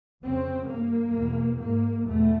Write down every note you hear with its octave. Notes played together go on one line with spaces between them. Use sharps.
F2 C#3 C4
G2 A#3
E2 B2
G#2 A#3
E2 B2 A3